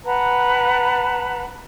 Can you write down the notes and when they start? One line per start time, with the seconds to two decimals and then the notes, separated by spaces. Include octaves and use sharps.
0.05 B4 F#5 A5 A#5